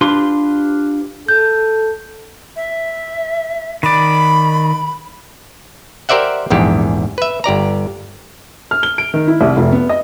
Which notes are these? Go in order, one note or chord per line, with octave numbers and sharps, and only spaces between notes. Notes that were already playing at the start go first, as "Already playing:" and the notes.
D4 F4 G4 B4 C6
A4 G6
E5
D#3 D5 B5
G4 A#4 C5 D5 E5 F#5
A#1 E2 G#2 G4
B4 E5
G1 G4 D5 A#5
F6
G7
D7
D#3
E4
C2
F1
B3
D#5